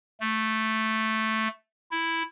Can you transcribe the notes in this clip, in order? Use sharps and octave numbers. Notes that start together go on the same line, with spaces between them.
A3
E4